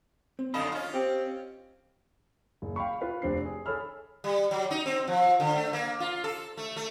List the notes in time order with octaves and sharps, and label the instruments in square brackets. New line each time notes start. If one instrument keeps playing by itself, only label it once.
[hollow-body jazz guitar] C4
[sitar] F#2 D3 D#5 [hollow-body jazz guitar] F5 A5 B5
[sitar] C#4 F4
[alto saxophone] C4 [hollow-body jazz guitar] G4
[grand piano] F#1
F5 G5 B5 C#6
F4 B4 F5
F1 C4 D4 C7
G#4
G#4 A4 C#5 B5 E6 F6
[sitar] G3
F#3
D#4
C4
F3
D3
A3
A#3
F4
A4
A3
A3